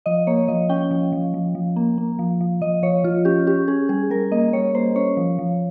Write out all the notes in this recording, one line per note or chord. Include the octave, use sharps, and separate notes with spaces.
F3 D#5
A#3 C#5
F3 D#5
C#4 G5
F3
F3
F3
F3
A#3
A#3
F3
F3
F3 D#5
F3 C#5
F3 F4
C#4 G4
C#4 G4
C#4 G#4
G3 G#4
G3 A#4
A#3 D#5
G3 C#5
A#3 C5
C#4 C#5
F3
F3